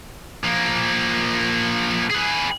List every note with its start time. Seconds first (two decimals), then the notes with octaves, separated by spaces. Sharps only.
0.43 F3 A#3
2.10 G#4 B4